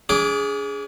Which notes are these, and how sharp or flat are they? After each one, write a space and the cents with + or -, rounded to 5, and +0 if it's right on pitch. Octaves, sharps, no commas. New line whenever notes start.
D4 -45 G#4 +0 D6 +0